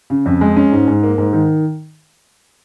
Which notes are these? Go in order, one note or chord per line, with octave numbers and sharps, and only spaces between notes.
C#3
F2
G#3
C#4
G#2
G#2
A#3
G#2
D#3